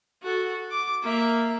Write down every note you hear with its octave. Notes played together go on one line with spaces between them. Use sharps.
F#4 A4
D6
A#3 E5